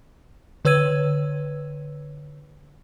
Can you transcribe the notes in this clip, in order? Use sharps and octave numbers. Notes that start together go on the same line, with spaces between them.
D3 B4 C#5 E6 G#6 D#7